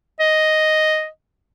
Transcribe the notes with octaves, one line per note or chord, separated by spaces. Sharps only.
D#5